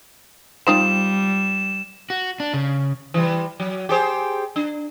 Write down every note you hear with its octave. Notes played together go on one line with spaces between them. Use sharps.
G3 C4 D#4 F4 E7
F#4
D4
C#3
E3 G3
F#3
G4 G#4 C5
D4